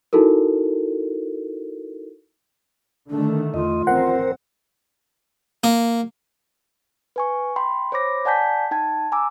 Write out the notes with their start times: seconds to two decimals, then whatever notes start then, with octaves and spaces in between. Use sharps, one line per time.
0.13 D#4 E4 F#4 A4 A#4
3.09 D3 D#3 A3 D4
3.54 E2 F4 D#5
3.87 A1 F2 C4 A#4 C5 F#5
5.64 A#3
7.16 B4 G#5 C#6
7.56 G5 B5 C6
7.92 C5 C#5 B5 D6 A#6
8.25 D5 F#5 G#5 A5 G6 B6
8.71 D#4 G5 A5 G#6
9.12 G#5 A#5 D6 E6